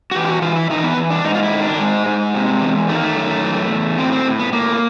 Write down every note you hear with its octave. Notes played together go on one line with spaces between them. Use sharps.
F#4
E3 G4
F4
F#4
E3 F4
E4
E3 D#4
B3
E3
D4
G#2 D#4
F4
E4
D#3
D4
G#2 G#3
G#2
C3
E2
D#3 A3
A#3
A3
F#2
E3
E2
A2 C4
C4
A2
B3
A2 A#3